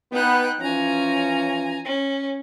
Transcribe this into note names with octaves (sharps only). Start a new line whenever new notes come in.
B3 D#4 G5 F#6
E3 F3 C#4 G#5 A#5
C#4